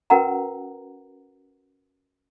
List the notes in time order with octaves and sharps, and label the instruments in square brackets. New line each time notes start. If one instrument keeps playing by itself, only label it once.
[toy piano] C#4 F#4 A#4 B4 F#5 A#5